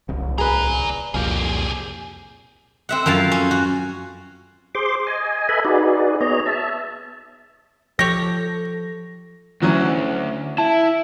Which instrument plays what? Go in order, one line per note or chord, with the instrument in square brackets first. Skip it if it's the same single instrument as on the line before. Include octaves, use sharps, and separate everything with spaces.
[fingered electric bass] D1 C2
[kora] G#4 B4 [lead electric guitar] D5 A#5
[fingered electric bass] C2 F2 A#2 [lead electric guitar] G4 G#4 [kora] F5
[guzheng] C4 E5 F#5
F#2 F3 F5 A5
C#4
F#4
[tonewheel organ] G#4 C5 C6 D6
D#5 G#5
A4 B4 D#5 E5 G#5 B5
D#4 F#4 G#4 B4 D5
B3 G#4 C#5 D#5 A#5
E5 A5
[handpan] F3 [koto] G4 C#5 [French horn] A4 [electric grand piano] A#6
[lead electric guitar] D2 [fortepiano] E3 F#3 C#4
[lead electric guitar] E4 [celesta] A5